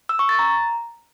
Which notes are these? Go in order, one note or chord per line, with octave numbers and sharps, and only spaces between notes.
E6
C#6
A6
A#5